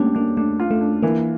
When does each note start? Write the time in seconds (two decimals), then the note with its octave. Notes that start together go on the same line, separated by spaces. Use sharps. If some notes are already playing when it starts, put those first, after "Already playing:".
Already playing: G3 A3 A#3 C#4 D4
0.15 A#3 D4
0.37 A3 D4
0.60 F4
0.71 A3
0.81 D4
1.03 E3 A#3